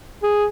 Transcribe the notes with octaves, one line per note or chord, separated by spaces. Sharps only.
G#4